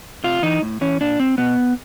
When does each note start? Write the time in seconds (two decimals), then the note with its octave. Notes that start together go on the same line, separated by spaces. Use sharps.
0.24 C3 F4
0.42 E3 D#4
0.62 A2
0.81 E3 C#4
1.01 A#2 D4
1.20 C4
1.38 B2 B3